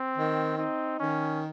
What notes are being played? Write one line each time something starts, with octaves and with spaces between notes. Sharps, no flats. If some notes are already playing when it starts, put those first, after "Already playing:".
Already playing: C4
D#3
C4 D#4
D#3 C#4